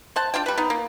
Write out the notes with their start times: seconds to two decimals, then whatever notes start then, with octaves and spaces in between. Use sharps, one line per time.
0.16 C5 F#5 A5
0.34 D4 F4 G5
0.46 G3 B4
0.58 B3 D#4
0.70 A#3